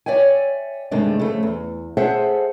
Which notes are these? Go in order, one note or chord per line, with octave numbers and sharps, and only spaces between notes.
C#5 D5 E5 G5 G#5
G2 C3 D#3 G#3 A3 D4
C#3 F3 A3
E2
G#4 A4 C5 E5 F#5 G5